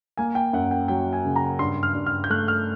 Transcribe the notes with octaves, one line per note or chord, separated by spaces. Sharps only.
A#3 G#5
G5
F#2 F#5
G5
F#3 G5
G#5
C#3
A#5
G2 C6
F6
G2
F6
G6
A3 F#6
F6